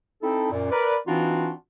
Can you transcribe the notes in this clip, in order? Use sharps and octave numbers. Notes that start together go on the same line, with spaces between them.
C4 D#4 E4 A4
F#2 A#2
A#4 B4 D5
E3 C4 D4 D#4 F4 F#4